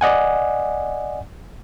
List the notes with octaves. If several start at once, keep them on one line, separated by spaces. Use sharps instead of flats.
D5 D#5 F#5 G#5